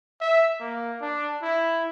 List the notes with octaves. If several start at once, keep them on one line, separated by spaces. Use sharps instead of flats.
E5
A#3
D4
E4